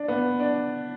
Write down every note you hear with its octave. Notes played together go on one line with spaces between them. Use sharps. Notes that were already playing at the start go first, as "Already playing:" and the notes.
Already playing: D4
B3
D4